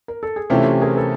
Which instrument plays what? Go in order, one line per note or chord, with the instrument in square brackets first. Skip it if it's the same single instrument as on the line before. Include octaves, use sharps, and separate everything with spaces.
[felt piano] A#4
A4
G#4
[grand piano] C3 E3 A3 C#4 E4 [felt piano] F4 G4
[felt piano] G#4 A#4
A4 B4